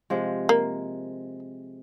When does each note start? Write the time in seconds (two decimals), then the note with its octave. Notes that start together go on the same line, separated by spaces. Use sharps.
0.10 C3 F3 G#3
0.49 A#3